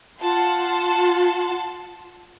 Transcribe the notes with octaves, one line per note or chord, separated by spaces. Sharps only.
F4 F#5 A5 C6